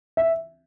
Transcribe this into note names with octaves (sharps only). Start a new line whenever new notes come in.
E5